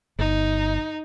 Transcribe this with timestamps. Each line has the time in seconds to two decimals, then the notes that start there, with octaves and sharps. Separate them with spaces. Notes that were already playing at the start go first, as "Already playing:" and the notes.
0.19 G1 D#4